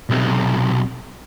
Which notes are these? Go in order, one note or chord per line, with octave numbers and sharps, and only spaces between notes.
B1 C3